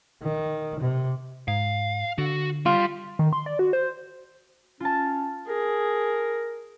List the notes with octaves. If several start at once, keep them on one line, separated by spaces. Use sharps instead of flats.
D#3
C3
G#2 F5
D3 F#4
G3 F4
D#3
C6
D5
F#4
C5
C#4 F4 A5
G#4 A#4